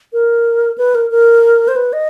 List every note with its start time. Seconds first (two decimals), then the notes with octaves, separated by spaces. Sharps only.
0.13 A#4
0.78 B4
0.95 A#4
1.11 A#4
1.68 C5
1.76 B4
1.93 D#5